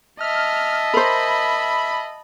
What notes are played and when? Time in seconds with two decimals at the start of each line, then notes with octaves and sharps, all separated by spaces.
0.21 D#5 E5 A5 F6
0.94 A#4 C5 B5